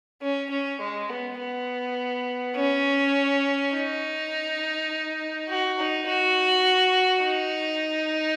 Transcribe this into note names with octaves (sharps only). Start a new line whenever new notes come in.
C#4
C#4
G#3
B3
B3
C#4
D#4
F#4
D#4
F#4
D#4